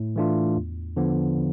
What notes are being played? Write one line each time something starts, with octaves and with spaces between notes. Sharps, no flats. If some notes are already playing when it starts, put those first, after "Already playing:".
Already playing: A2
E3 A3 D4 F4
E2
D3 F3 B3